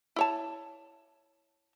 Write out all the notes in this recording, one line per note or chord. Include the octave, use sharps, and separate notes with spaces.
E4 C#5 A5